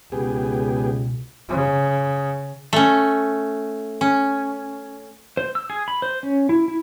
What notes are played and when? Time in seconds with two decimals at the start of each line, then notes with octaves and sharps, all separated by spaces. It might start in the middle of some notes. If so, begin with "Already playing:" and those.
0.12 C#2 B2 B3 G4 G#4
1.49 C#3
2.73 A3 C#4
4.01 C#4
5.37 C5
5.55 E6
5.70 G#4
5.88 B5
6.02 C5
6.23 C#4
6.49 E4
6.68 E4